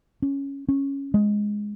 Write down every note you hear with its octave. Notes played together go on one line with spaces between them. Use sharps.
C#4
C#4
G#3